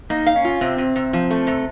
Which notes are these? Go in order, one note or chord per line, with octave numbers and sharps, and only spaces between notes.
A#3 D#4
F5
C#4
F4
C3 C4
C3
C3
F3
A3
C3